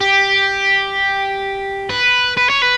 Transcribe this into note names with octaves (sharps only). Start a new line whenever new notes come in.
G4
B4
B4
C#5
B4